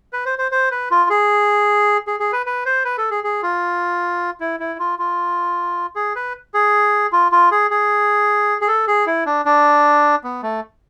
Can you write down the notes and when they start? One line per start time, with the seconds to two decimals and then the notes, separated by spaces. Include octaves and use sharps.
0.13 B4
0.26 C5
0.39 C5
0.51 C5
0.71 B4
0.91 F4
1.10 G#4
2.07 G#4
2.20 G#4
2.33 B4
2.46 B4
2.66 C5
2.85 B4
2.98 A4
3.11 G#4
3.24 G#4
3.43 F4
4.40 E4
4.60 E4
4.79 F4
4.99 F4
5.96 G#4
6.16 B4
6.54 G#4
7.12 F4
7.32 F4
7.51 G#4
7.71 G#4
8.61 G#4
8.68 A4
8.88 G#4
9.06 E4
9.26 D4
9.45 D4
10.24 B3
10.43 A3